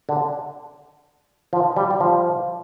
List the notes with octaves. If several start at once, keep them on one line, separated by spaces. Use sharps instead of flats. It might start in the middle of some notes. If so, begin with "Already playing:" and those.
D3
F3
G3
G3
F3